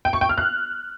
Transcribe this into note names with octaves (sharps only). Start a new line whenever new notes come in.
G5
C#6
G5
F6
F#6